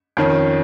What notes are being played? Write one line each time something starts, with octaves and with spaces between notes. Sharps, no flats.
F2 D#3 C#4